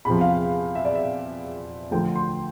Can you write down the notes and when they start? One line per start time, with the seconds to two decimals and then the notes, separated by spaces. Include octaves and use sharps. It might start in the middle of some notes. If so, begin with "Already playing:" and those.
0.05 E2 C3 F3 B5
0.21 F5
0.75 E5
0.85 D5
0.95 E5
1.91 D2 D3 F3 G5
2.16 C6